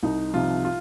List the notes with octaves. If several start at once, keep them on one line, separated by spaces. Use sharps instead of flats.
C2 D#4
C3 F3 F4
F4